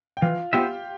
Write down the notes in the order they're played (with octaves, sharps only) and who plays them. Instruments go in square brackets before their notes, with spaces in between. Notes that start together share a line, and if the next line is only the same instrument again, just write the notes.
[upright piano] G5
[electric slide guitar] E3 [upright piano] F4 F5
[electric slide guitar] B3 F4 C5 E5 [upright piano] G4 G5